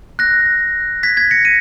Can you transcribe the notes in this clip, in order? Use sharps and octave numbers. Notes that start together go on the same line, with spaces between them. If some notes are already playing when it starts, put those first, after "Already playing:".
F#6 A#6
G#6 B6
G#6 B6
A#6 C#7
B6 D#7